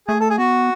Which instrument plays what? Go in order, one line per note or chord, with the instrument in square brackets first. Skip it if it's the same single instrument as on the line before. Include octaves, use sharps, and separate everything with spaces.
[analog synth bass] A3 [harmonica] G#4
[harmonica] A4
G#4
[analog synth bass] B3 [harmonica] F#4